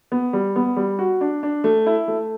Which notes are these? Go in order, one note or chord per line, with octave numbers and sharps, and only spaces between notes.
B3
G3
B3
G3
F#4
D4
D4
A3
E4
A3